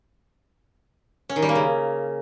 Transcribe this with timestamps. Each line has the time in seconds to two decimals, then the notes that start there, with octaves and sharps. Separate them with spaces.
1.29 C#4
1.36 D#3
1.42 G3
1.49 A#3
1.55 C#3